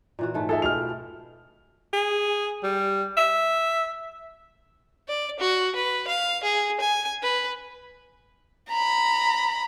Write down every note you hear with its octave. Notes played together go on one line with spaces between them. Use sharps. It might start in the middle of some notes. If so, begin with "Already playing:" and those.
A#2 E3 F#4
G#2 A3
F4 G#4 A4 E5
B2 A3 G5 F6 F7
G#4
G3
E5
D5
F#4
B4
F5
G#4
G#5
B4
A#5 B5